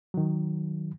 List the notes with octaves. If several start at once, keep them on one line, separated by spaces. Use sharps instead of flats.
D#3 F#3